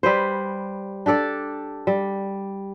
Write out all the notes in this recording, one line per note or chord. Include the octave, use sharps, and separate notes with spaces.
G3 B4 C5
D4 G4 A4 D5
G3